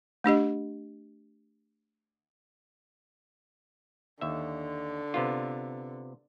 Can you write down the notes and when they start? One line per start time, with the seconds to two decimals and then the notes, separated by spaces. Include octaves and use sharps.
0.24 A3 D4 G4 D#5
4.21 D#2 D3 E5
5.14 C3 B3 F4